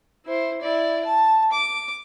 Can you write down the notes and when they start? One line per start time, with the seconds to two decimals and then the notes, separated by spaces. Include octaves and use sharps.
0.25 E4 C5
0.61 E4 D5
1.05 A5
1.52 D6